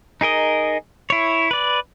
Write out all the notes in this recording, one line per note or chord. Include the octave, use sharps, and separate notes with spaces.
D#4 G#4 A#4 D#5
E4 C#5
B4 D5